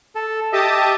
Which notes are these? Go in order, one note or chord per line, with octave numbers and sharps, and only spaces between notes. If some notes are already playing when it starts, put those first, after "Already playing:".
A4
G4 D#5 E5 A5 D#6